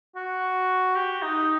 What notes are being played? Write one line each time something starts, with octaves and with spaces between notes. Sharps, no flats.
F#4
G4
D#4